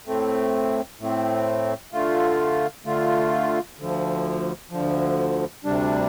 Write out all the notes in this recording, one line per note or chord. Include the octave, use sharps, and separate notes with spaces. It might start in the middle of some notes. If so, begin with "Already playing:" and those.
A2 A3 C4
A2 A3 C4
D3 A3 F4
D3 A3 F4
D2 D3 F3
D2 D3 F3
D2 C3 G3 D4